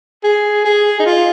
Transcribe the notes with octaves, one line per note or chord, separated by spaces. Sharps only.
G#4
G#4
D#4
F4